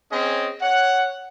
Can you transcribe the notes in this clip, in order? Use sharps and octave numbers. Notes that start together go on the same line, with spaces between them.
C4 C#4 G#4 D#5
C#5 F#5